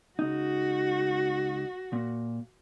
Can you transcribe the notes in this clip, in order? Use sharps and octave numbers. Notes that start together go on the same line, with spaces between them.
C#2 D#4 F#4
A#2